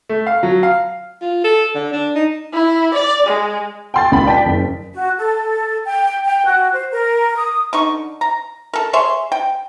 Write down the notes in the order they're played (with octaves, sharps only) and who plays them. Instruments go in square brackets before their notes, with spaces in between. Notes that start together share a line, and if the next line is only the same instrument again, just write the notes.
[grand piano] A3
F5
F#3
F5
[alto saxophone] F4
A4
D3
D4
D#4
[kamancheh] E4
D5
G#3
[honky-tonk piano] G5 C6 A6
C#2 B5
D5 G5 A5 B6
F#1
[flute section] F#4
A4
G5
G5
F#4
C5
A#4
D#6
[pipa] D3 D#4 C#6
A#5
A4 A#4
G#4 C#5 E5 C6
G5